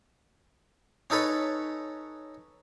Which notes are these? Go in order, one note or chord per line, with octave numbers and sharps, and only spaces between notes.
C#4 D#4 A4 B4 C#5